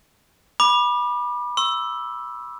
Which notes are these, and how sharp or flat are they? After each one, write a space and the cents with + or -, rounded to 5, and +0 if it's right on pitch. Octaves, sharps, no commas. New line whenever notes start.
B5 -20 D6 +25
C#6 -40 E6 +5